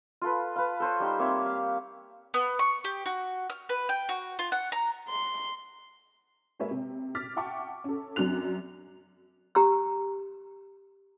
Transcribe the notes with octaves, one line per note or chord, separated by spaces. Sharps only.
F4 A4 B4
B4 F5
A4 C5 C#5
G3 D#4 G4 C6
A#3 C4 C#5 E5
F5
B3
C#6
G4
F#4
F6
B4
G5
F#4
F4
F#5
A#5
C6
G#3 A#3 B4 C#5 E5
C3
D6 F6 A6 B6
E5 F#5 G5 A5 C#6 D6
C#4 A4
F#2 C4 D4 F#4 F#6 F7
G4 A#5 C6 E6